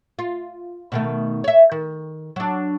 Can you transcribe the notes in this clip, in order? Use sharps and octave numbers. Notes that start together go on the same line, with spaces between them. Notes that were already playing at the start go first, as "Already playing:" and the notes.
F4
B2 D#3 A3
C#5 E5
D#3
F#3 D4